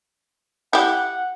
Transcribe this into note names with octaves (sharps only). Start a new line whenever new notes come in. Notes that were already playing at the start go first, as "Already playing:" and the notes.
E4 G4 F#5